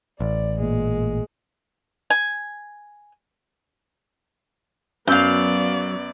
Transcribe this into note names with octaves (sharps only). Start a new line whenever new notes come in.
A1 D5
A#2 G#3
G#5
F#2 F#3 B3 D5 F5 G6